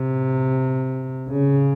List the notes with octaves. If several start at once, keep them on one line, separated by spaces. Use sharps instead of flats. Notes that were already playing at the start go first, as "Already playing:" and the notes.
Already playing: C3
C#3